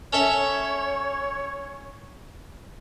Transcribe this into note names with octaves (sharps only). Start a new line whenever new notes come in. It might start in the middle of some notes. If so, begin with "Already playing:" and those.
C#4 A4 C#5 E5